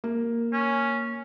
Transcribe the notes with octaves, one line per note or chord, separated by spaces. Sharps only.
A#3
C#4